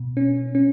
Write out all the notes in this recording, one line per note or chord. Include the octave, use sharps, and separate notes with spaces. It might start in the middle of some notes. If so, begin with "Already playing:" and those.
Already playing: B2
C#4
C#4